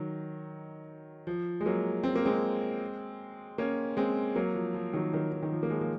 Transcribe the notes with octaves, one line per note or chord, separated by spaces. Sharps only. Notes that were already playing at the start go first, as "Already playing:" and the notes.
Already playing: D#3 F#3
F3
G#3
F#3 A#3
C4
A#3
G#3 C4
A#3 C#4
G#3 C4
F#3 A#3
F3
F3
D#3 F#3
D#3 F#3
D#3
D#3
F3
A#3
F3 G#3
A#3